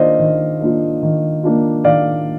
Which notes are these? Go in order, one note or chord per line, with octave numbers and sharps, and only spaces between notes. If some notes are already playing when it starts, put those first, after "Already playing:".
Already playing: D#3 A#3 D4 F4 C5 D5 D#5 F5
D#3
A#3 D4 F4
D#3
A#3 D4 F4
D#3 D5 F5